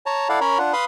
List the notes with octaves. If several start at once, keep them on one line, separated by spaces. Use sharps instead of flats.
C#5 A5 A#5
E4 A4 D5 F5 F#5
C#4 A#4 C#5 A#5 B5
D4 F4 F#5
B4 F5 B5 C6 D#6